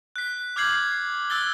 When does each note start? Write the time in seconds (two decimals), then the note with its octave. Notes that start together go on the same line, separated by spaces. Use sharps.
0.16 F#6 B6
0.56 D6 F6 G6 G#6 C7 F#7
1.30 E6 F#6 A6 G7